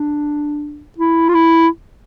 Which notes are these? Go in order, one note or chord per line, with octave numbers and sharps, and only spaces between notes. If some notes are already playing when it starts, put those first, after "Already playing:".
Already playing: D4
E4
F4
E4